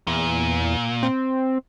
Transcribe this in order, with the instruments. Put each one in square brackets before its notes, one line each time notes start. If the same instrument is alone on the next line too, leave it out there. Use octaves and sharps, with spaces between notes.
[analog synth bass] E2 [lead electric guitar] A#2
[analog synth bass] C4